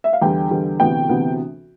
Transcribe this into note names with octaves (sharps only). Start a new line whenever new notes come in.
E5
F5
E2 D3 G3 G5
E2 D3 G3
D2 C3 E3 B3 G5
D2 C3 E3 B3